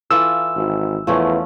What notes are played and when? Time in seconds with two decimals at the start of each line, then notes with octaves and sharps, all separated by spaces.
0.11 E3 F4 A4 E6
0.56 G#1
1.07 E2 F3 A3 C#4